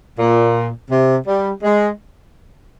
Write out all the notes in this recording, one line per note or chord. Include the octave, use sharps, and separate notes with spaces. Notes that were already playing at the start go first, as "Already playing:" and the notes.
A#2
C3
G3
G#3